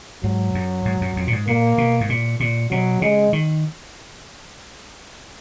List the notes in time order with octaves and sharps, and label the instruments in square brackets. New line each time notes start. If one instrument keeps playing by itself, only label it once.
[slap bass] G#2 [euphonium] F#3
[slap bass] F#2
G#2
F#2
F2
A#2
G#2
[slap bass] A#2 [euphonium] A#3
[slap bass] B2
G#2
A#2
A#2
[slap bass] B2 [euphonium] F#3
[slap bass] C#3 [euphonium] G#3
[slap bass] D#3